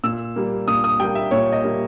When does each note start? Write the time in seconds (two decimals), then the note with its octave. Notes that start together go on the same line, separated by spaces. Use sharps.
0.04 A#2 E6
0.36 G3 A#3
0.68 A#2 D#6
0.84 D#6
1.00 G3 A#3 G5
1.15 E5
1.31 A#2 C#5
1.52 D#5
1.64 G3 A#3